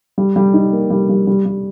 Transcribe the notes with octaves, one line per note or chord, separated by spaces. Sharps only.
G3
G3
D#4
A#3
G3
G3
G3
G3